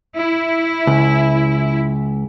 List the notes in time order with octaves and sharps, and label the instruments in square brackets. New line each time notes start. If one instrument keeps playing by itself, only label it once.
[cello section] E4
[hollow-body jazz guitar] C#2